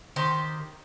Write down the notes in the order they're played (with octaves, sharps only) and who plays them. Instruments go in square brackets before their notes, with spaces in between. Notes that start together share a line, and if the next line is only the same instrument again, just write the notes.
[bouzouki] D#3 G4 C5